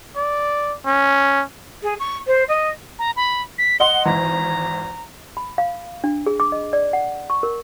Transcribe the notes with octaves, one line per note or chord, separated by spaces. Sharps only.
D5
C#4
G#4
C#6
C5
D#5
A#5
B5
B6
D#5 F#5 C6 G7
G#1 E3 A#5
B5
F5
D4
G#4
D6
D#5
D5
F#5
C#6
A#4